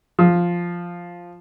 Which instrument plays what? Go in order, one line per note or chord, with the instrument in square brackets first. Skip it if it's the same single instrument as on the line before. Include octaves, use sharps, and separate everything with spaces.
[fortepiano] F3